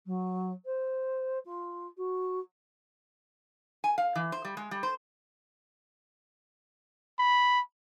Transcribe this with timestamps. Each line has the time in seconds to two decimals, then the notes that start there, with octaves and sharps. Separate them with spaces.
0.06 F#3
0.65 C5
1.45 F4
1.97 F#4
3.84 G#5
3.98 F5
4.15 E3
4.32 C5
4.45 G3
4.57 G#3
4.71 G3
4.83 C5
7.19 B5